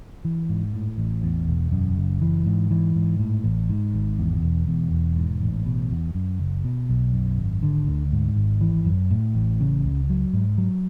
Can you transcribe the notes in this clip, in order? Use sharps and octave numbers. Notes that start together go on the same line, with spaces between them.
E3
G#2
A2
A1
E2
E1
F#2
F#1
E3
G#2
E3
G#2
A2
A1
G#2
G#1
E2
E1
E2
E1
G#2
A1
B2
E2
F#2
F#1
B2
B1
F#2
G#1
D3
D2
G#2
G#1
E3
F#2
A2
A1
C#3
C#2
F#3
G#2
F#3